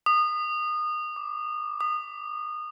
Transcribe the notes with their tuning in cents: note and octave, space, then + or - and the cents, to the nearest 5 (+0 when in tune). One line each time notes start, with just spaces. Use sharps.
D#6 -25
D6 +0
D#6 -25